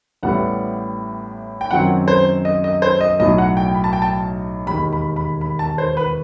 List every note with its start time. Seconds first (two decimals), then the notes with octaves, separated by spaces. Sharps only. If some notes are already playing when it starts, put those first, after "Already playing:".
0.23 A1 A2 G3 B3 F#5
1.61 G5
1.71 F#2 D#3 F#3 C4 F#5
2.08 C5
2.45 D#5
2.64 D#5
2.82 C5
3.01 D#5
3.19 B1 A2 F#3 D#5
3.38 F#5
3.57 G5
3.75 B5
3.84 A5
3.93 G5
4.02 A5
4.67 E1 D#2 D#3 B5
4.93 B5
5.16 B5
5.41 B5
5.59 A5
5.78 C5
5.97 B4